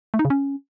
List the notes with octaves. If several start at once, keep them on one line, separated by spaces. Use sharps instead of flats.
A3
D#4
C#3
C#4